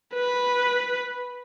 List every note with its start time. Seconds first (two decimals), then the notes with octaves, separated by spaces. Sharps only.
0.14 B4